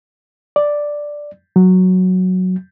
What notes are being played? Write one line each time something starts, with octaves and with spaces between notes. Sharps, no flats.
D5
F#3